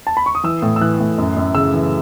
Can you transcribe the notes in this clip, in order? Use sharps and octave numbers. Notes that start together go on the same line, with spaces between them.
A5
B5
C#6
D#6
E3 E6
A2
E6
E3 F#6
A2
F#2
F#2
C#3 E6
E3